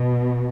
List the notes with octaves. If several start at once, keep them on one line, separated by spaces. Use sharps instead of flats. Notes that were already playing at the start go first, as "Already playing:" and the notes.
Already playing: B2